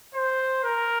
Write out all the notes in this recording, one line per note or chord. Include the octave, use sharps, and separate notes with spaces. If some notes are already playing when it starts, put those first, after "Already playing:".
C5
A#4